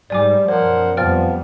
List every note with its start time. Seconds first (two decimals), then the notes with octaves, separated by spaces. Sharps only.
0.10 G#2 G3 D5 G#5 D6
0.48 F#2 B2 F3 A#4 C5 C#5 F#5
0.97 F2 F3 G3 B3 G5 F6 A6